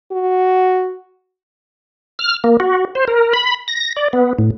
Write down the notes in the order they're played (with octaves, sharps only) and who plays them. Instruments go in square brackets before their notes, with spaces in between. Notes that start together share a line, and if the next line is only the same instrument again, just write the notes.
[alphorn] F#4
[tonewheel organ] F6
A#3
F#4
C5
A#4
B5
A#6
D5
B3
A2